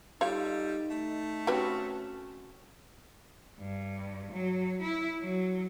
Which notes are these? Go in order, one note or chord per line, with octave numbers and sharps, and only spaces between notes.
G3 D#4 F4 A4 C#5 F5
A3
C4 C#4 F#4 G4 B4 G5
G2
F#3
E4
F#3